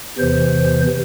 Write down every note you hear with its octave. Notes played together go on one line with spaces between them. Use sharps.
E2 C3 E3 C5